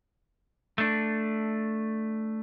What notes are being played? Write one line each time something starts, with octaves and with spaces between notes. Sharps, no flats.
A3 D4